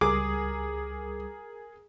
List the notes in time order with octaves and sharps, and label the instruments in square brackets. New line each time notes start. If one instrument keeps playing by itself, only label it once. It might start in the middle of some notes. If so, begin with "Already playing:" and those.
[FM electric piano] C#2 G3 D#6 [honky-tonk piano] G#4 A#4 [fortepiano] D6